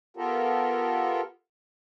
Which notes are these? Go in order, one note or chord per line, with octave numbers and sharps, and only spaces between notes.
B3 F4 G4 A4 A#4